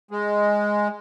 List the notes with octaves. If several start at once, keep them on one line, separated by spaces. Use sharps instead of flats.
G#3